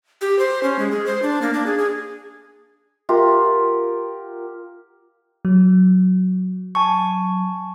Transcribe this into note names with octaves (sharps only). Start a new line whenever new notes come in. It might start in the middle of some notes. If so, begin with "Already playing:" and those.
G4
C5
C#4
G#3
G#4
C5
D4
A#3
D4
G#4
G#4
F4 G4 A#4 F#5
F#3
G#5 A5 C#6